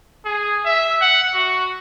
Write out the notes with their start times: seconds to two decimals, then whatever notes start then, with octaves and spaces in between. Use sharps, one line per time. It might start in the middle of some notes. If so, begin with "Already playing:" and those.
0.25 G#4
0.65 E5
1.01 F#5
1.34 F#4